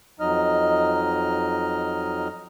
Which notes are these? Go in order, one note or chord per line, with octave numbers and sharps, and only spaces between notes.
F2 F#3 D#4 D#5 F6